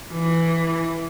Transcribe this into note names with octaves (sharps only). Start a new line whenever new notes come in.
E3